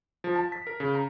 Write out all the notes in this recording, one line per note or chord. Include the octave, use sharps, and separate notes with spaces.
F3
A5
B6
A#4
C#3
A#5